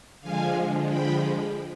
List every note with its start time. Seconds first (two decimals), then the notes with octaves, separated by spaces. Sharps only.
0.21 D3 F3 G#3 F5 G#5
0.89 G5 B5